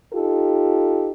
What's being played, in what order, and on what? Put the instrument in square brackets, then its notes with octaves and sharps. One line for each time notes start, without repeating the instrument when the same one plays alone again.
[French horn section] D#4 F4 G4 A4